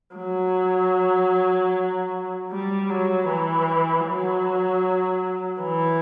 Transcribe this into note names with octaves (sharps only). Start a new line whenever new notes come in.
F#3
G3
F#3
E3
F#3
E3